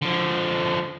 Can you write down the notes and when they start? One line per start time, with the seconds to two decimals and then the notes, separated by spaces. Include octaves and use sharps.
0.02 D3 F3